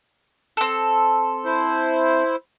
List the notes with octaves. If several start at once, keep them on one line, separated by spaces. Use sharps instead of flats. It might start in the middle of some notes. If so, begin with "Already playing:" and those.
C4 A4
E4 C5